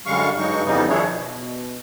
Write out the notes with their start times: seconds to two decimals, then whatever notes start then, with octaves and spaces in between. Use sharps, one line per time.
0.06 F#2 D3 G3 G#3 F5 C#6
0.37 G2 F#3 G#3 D#4 C#6
0.65 F2 C#3 E3 G3 B3 D#4
0.89 D#3 F3 D4 E4 G#4 C#5
1.06 B2